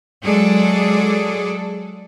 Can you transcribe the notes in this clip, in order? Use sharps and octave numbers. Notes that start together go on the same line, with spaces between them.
F#3 G#3 G#4 A4 D5